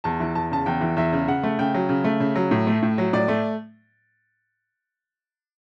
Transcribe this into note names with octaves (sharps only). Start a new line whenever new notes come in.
E2 A5
E3
E2 A5
C#3 A5
E2 G5
E3
E2 E5
C#3
C#3 F#5
A3
C#3 G5
F#3
C#3
A3
C#3
F#3
A2
A3
A2
F#3
A2 D5
A3